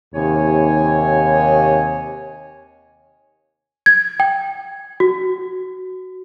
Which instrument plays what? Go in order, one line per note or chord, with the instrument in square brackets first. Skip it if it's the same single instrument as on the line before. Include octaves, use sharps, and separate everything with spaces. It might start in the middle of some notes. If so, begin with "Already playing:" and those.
[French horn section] D#2 C3 [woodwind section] C#5 G#5
[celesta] G#6
G5
F#4